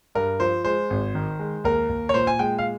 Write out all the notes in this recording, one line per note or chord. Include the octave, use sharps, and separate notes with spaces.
G2 A#4
F3 C5
G#3 C5
G#1
D#3
G#3
D#2 A#4
D#2
C#5
A#2 C5
G#5
G#3 G5
F5